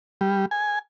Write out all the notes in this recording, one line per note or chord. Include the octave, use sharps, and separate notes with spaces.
G3
G#5